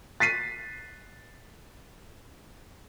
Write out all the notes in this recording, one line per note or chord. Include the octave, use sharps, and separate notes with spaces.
A6 B6 C7 D#7